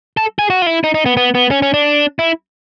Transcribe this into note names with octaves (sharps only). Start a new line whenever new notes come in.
A4
G#4
F#4
F4
E4
D#4
D#4
B3
B3
B3
C#4
C#4
D4
E4